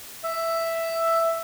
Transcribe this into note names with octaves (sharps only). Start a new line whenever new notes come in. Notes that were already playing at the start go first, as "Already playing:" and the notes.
E5